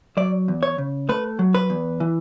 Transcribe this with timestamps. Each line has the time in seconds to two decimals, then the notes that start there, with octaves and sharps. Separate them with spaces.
0.17 F#3 D5
0.48 E2
0.63 C#5
0.78 C#3
1.09 A3 B4
1.39 F#3
1.54 B4
1.70 E2
2.00 E3